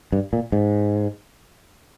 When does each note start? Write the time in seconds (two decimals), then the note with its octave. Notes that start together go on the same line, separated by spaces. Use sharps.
0.12 G2
0.33 A#2
0.52 G#2